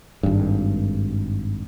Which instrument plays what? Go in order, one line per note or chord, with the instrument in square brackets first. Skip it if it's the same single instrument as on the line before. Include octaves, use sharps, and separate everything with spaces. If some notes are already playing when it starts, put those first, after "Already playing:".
[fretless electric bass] G#1 G2